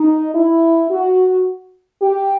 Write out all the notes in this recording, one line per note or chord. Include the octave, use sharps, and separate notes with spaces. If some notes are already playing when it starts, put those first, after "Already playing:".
Already playing: D#4
E4
F#4
G4